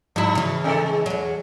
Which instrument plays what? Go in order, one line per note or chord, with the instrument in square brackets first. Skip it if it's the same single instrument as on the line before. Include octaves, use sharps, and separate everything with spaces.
[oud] G#2 E4 [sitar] F3
[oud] C#3 E3
[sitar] C3 D#3 A4
G#3
[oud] E2 F#3